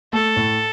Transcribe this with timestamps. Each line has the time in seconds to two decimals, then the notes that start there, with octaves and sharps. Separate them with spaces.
0.13 A3 A4
0.36 A2